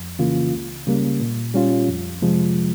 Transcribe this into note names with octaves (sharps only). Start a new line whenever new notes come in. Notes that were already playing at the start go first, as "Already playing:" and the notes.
Already playing: F2
C#3 E3 A#3 F4
C#2
C#3 G3 A#3
A#2
G3 C#4 F4
F2
C3 F3 G#3